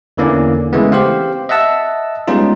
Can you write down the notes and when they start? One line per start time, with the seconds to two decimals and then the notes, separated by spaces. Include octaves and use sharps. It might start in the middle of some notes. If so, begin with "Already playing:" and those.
0.17 E2 D3 E3 A#3 C#4 D5
0.73 C#3 E3 G#3 A3 B3
0.92 C4 G4 C5 F5
1.49 D#5 E5 F#5 A5 E6
2.27 G3 G#3 B3 C#4 D#4 F4